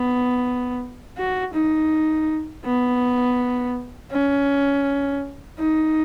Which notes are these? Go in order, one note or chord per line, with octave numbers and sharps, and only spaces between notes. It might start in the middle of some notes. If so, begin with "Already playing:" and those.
Already playing: B3
F#4
D#4
B3
C#4
D#4